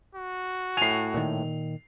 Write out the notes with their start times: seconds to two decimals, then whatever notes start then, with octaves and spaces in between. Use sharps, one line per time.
0.15 F#4
0.77 A2 G#5 C7 F7
1.14 A#2 D#3